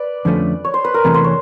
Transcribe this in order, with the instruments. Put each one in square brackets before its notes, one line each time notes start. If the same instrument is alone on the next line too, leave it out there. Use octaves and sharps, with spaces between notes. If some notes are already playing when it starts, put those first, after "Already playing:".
Already playing: [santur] B4 D5
[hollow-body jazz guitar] F2 D3 F3 A3 C#4
[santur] C#5
C5
B4
A#4
[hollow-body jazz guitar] E2 C3 E3 A3 [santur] B4
[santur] C5
C#5